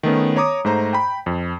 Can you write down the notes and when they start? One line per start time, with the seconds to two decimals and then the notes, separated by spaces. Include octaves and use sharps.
0.03 D#3 A3 B3 C#4
0.36 C#5 A#5 D6 D#6
0.65 G#2 A3 C5 A#5
0.93 G5 B5
1.26 F2